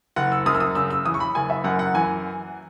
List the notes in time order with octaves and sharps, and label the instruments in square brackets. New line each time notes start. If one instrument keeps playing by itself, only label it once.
[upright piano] F#1 F#5
E6
F#2 D#6
E6
D#6
C#3 E6
E6
E3 D#6
C#6
B5
F#1 G#5
E5
F#2 F#5
F#5
E3 G#5